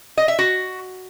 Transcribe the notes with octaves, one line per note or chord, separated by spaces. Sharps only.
D#5
E5
F#4